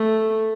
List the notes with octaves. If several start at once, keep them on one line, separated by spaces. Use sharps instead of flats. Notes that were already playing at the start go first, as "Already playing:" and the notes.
Already playing: A3